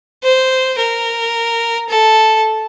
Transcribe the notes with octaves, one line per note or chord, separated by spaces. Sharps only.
C5
A#4
A4